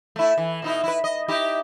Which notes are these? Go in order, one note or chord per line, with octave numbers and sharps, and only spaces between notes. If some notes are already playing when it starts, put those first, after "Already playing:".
A3 E4
E3
B2 D#4 E4
E4 B4
D#5
D#4 E4 G4